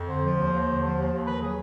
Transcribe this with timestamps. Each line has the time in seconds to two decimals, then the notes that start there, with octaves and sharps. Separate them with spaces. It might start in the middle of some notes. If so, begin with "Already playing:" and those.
Already playing: F2
0.08 D3 C5
0.23 F3
0.38 D#2
0.52 D#2
0.67 D3
0.82 F3
0.97 D#2
1.12 D#2
1.27 D#3 B4
1.41 F#3 G#4